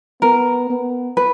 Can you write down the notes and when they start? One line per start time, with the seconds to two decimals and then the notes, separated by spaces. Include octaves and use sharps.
0.22 B3 A#4
0.70 B3
1.17 B4